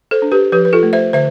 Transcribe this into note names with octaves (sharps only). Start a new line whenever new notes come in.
A4 C5
D4
G4 B4
F3 G4 B4
B4
F4 A4
A3
C5 E5
D3 C5 E5